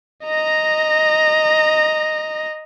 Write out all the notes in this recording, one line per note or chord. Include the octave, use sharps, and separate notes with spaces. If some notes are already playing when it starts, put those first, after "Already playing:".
D#5 A#5